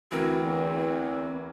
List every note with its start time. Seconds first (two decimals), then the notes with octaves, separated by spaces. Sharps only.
0.11 D2 E3 C4 F#4 A#4
0.43 E2